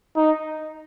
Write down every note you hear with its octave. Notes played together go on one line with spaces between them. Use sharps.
D#4